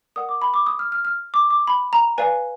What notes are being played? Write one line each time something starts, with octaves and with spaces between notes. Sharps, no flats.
A#4 D5 F#5 D#6
D6
B5
D6
D#6
F6
F6
F6
D6
D6
B5
A#5
B4 D5 F5 G#5